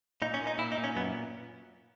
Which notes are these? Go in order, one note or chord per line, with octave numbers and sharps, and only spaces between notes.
A#2 D#4
C#4
A#2
D#4
A#2 E4
D#4
A#2
C#4
F#2 B3